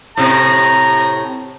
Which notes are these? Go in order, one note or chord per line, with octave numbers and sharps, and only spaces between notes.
A2 C3 A#5